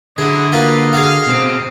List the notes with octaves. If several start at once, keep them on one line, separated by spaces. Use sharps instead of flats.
D3 F#3 E4 G#4 D#5
A#3 F4 F#4 B4 F5
F#4 G#4 F5
B2 C4